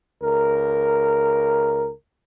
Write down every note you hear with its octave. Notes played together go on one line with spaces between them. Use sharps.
C#2 A#4